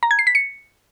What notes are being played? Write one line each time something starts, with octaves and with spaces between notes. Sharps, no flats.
A#5
G#6
C7
B6
C#7